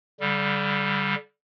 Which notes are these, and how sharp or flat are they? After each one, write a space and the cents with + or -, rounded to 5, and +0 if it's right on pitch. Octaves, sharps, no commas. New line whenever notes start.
D3 -40 G3 -5